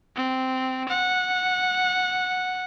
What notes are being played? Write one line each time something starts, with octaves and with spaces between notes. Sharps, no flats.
C4
F#5